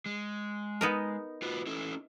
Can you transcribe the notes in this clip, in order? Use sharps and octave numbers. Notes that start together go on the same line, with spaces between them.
G#3
B3 D#4 A#4
F4 F#4 B4
C#4 E4 A4